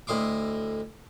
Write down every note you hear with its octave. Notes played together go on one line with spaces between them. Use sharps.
D2 A2 D#5 C6 D6